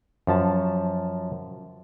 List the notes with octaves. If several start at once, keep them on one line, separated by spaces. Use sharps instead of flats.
F#2 F3 A5